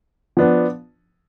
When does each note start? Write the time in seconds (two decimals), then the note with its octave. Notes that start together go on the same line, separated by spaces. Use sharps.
0.37 F3 B3 D4